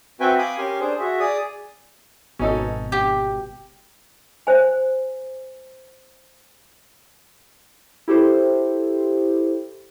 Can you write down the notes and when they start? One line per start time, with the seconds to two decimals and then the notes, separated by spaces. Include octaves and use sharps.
0.20 C4 F#4 B4 E5 G5 G#5
0.38 F5 G#5 B5 D6 D#6
0.58 C#4 G4 A#4 G#5 C6
0.80 D4 G#4 C5
1.00 F#4 G#4 E5
1.20 G#4 D5 D#6
2.39 G#1 B2 C#4 D#4 A4
2.92 G4
4.47 C5 G#5
8.08 E4 G4 A4 C5